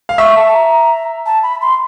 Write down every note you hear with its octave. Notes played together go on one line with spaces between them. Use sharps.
F5
E5 C#6
A5
A#5
A5
B5
C6